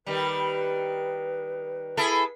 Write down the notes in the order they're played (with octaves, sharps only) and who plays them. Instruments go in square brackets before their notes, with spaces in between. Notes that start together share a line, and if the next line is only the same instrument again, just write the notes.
[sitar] D#3 G3 [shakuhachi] B4
[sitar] E4 G#4 A4